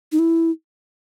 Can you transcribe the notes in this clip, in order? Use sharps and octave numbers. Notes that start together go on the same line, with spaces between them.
D#4
E4